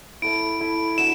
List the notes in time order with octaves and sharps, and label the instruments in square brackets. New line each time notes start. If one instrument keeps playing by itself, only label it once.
[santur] E4 A4 E5 [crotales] D7
[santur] E4 A4 E5
[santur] F#3 D4 B4 E5 [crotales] E7